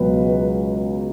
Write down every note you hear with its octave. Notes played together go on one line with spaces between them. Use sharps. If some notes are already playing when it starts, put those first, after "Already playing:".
Already playing: C#2 B2 F#3 B4